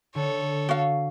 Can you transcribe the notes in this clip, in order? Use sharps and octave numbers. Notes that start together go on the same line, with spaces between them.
D3 A4 C#5
F#4 F5